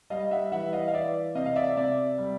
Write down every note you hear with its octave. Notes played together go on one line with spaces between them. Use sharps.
G3 D#5 F5
E5 F#5
E3 E5 F#5
D#5 F5
F5
E3 D5 E5
C3 D#5 F5
F5
D5 E5
C3 D5 E5
G3